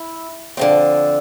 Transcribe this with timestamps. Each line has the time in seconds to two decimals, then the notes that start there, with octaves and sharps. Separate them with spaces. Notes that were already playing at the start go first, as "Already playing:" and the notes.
Already playing: E4
0.57 D3 F3 C4